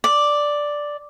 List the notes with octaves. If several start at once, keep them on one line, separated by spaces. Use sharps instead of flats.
D5